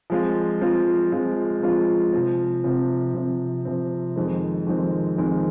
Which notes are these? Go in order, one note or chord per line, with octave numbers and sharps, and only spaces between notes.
F3 G#3 C4 F4
F3 G#3 C4 F4
F3 G#3 C4 F4
F3 G#3 C4 F4
C3 F3 C4
C3 F3 C4
C3 F3 C4
C3 F3 C4
F2 D#3 G#3 C4
F2 D#3 G#3 C4
F2 D#3 G#3 C4